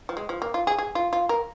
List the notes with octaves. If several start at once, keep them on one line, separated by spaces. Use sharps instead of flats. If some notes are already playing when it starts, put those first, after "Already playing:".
F3
G#3
F3
A#3
F4
G#4
G#4
F4
F4
A#4